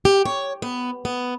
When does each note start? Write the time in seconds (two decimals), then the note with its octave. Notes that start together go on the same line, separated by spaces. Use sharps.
0.05 G4
0.25 C#5
0.62 B3
1.05 B3